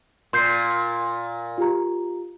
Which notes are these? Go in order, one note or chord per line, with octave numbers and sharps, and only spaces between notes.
A#2 C6 G6 C7
F4 G4 A#5